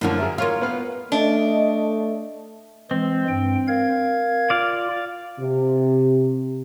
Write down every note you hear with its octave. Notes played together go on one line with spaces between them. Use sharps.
F#2 A2 D3 F3 A#3
G#4 A#4 E5
A#3 F4 C#5 F6
B3 B4 F5
A3 D4 D#5
E3 G#3 C4
G2 G5
A#4 F5 G#6
F4 D5 F5
C3